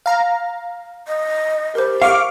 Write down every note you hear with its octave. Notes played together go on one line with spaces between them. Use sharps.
F5 A#5
D#5
G4 A#4 C5
F5 C#6 D6 F6